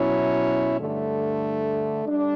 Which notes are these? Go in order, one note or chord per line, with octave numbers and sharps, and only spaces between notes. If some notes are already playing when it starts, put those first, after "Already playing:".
Already playing: B2 F#3 C#4 E4
G2 D3 A3
G3 D4